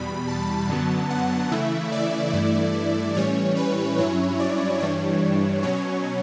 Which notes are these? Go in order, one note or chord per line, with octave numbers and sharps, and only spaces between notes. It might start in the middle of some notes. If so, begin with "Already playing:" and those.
Already playing: E2 B2 G3 B5
A5
F#2 D3 F#3 B3
F#5
C#3 E3 A3 E4 E5
D5
G2 E3 A3 E4
A2 E3 G3 C#4 C#5
B4
G2 F#3 C#4 E4 C#5
D5
G2 E3 G3 D4 C#5
B2 F#3 C#4 C#5